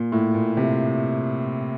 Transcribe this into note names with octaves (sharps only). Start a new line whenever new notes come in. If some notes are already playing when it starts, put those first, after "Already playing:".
Already playing: A#2
A2
A#2
C3